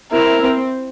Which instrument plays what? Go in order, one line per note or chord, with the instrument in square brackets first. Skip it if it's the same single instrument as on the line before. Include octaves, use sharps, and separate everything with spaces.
[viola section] C4 E4 [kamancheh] A#4
[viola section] C4